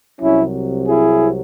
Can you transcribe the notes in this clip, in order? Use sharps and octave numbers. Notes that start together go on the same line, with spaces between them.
C2 C3 F#3 C#4 E4
E4 G#4